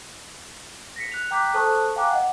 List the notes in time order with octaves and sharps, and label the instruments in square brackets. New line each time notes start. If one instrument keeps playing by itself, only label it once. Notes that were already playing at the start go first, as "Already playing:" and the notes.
[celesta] A#6 B6 C#7
F#6 F7
G5 A#5 D6 F#6 G6 B6
A4 C5 A5 C#6 D#6 F#6
F5 G5 G#5 A#5 D6 F#6
D#5 F#5